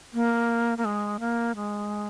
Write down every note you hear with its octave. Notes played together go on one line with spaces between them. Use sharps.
A#3
A#3
G#3
A#3
G#3